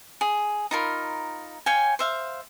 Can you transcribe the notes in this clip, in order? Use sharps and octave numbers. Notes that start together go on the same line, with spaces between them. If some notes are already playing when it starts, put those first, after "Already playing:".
G#4
D#4 F4 A#4 B5
C#5 F5 G5 G#5
C5 E5 F5